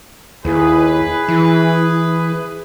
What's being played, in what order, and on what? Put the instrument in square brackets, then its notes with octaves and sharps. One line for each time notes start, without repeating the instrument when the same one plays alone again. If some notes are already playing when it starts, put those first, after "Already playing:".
[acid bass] D#2 [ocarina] E4 [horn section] G#4 B4
[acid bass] E3 [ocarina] E4